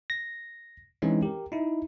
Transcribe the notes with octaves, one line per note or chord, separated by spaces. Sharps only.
A#6
E3 G#3 C4 C#4 D#4
G4 A#4
D#4 E4